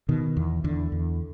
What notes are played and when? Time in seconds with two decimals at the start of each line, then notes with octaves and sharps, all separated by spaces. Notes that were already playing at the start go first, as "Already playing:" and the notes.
0.09 B2 D#3
0.37 E2
0.64 E2 D3
0.92 E2